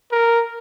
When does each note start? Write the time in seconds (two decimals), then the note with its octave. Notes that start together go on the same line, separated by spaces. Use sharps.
0.12 A#4